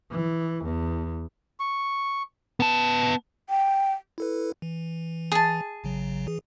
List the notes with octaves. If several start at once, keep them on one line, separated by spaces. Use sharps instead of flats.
E3
E2
C#6
B3 A5
G5
E4 A4 B4
E3
G#4 A5
A1 C#3 F#3
E3 G#4